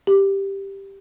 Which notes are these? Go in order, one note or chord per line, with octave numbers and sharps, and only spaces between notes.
G4